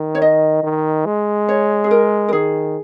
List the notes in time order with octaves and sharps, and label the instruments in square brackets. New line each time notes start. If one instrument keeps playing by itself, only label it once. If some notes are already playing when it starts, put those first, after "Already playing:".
Already playing: [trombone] D#3
[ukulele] C#5
D#5
[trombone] D#3
G#3
[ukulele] C#5
G#4
A#4
A#4
[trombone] D#3 [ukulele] G#4